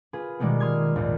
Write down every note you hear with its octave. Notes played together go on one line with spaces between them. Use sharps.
F4 G#4 B4
B2 D#3 G3 G#3 A#3 B3
C6 D#6 F6 G#6
A#1 D#2 G#2